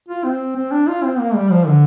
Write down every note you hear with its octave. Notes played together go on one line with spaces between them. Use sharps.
F4
C4
C4
D4
F4
C4
A#3
G3
F3
D3